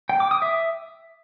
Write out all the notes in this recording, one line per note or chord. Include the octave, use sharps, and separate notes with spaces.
G5
D6
D#6
E5